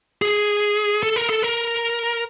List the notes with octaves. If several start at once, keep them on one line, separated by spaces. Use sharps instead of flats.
G#4
A4
A#4
A4
A#4